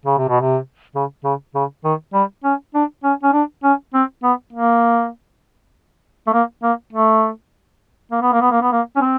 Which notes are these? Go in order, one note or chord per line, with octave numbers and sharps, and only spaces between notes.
C#3
C3
B2
C3
C#3
C#3
C#3
D#3
G3
C#4
D4
C#4
C#4
D4
C#4
C4
B3
A#3
A3
A#3
A#3
A3
A#3
B3
A#3
B3
A#3
B3
A#3
C#4
C4